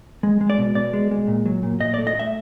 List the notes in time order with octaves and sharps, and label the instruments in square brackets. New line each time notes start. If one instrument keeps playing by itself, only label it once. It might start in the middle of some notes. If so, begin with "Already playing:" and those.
[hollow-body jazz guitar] G#3
G#3
D5
B2
B2 D5
G#3
G#3
A#2
F#3
A#2
A#2 D#5
D5
A3
D#5
A3 E5